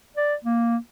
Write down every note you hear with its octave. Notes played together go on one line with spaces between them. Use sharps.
D5
A#3